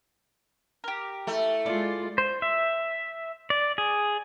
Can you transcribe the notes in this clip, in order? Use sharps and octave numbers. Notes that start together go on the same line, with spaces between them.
G4 A#4
A3 E4
G#3 F4 D5
C5
E5
D5
G#4